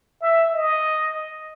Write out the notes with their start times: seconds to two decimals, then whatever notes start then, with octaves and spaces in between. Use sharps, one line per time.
0.21 E5
0.52 D#5